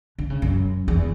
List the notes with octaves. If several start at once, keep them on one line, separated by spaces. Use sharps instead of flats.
D3
C#3
F#2
E2